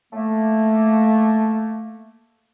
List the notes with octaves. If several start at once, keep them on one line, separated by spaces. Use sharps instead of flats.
A3 A#3